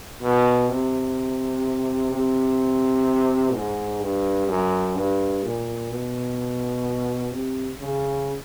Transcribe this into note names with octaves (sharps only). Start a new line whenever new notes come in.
B2
C3
C3
G#2
G2
F#2
G2
A#2
B2
C3
C#3